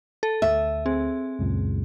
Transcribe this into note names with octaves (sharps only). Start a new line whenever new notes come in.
A4
D2 E5
C4 G#4
C#2 F#2 A#2